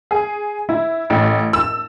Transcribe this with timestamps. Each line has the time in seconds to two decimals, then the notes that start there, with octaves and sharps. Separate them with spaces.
0.11 G#4
0.69 E4
1.10 A1
1.53 E6